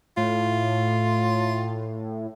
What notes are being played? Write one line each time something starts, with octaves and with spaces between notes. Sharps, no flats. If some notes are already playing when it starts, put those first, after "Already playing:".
A2 F4